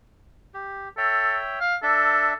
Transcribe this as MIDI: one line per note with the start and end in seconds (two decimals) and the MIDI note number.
0.54 0.89 67
0.98 1.37 69
0.98 1.59 73
0.98 1.59 76
0.98 1.59 79
1.61 1.75 77
1.83 2.34 62
1.83 2.35 69
1.83 2.34 76